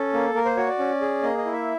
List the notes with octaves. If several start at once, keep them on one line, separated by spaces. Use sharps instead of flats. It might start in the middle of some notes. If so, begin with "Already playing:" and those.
Already playing: C#4 A4
A#3
A#3 A#4
C5
F#4 C#5
D5
C#4
G#4
A#3 D#5
D#5
E4
E5